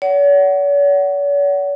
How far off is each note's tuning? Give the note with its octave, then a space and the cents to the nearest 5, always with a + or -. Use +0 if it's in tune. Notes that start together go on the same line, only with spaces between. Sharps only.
C#5 +45 F#5 +15